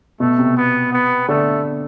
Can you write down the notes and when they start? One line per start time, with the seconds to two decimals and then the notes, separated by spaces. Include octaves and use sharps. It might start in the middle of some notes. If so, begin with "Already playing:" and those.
0.20 B2 A3
0.38 C3
0.57 B3
0.93 B3
1.28 D3 A3